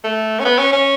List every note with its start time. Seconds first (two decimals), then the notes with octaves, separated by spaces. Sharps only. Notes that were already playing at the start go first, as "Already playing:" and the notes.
0.04 A3
0.40 C#4
0.45 B3
0.59 C#4
0.73 C#4